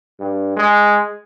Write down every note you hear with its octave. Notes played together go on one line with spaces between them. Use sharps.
G2
G#3